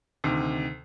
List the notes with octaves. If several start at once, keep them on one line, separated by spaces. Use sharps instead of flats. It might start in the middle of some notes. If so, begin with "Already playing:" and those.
D2 C3 D#3